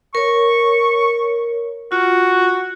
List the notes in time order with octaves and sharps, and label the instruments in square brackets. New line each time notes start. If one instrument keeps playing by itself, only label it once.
[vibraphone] A#4 C#5 [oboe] C#6
[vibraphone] F4 [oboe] F#4